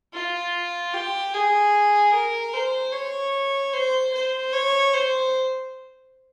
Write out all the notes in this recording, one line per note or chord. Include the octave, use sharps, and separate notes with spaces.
F4
G4
G#4
A#4
C5
C#5
C5
C5
C#5
C5